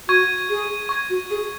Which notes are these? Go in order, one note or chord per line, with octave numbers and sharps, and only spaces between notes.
F#4 C#6 G#6 D#7
G#4
C#6 G#6 D#7
F#4
G#4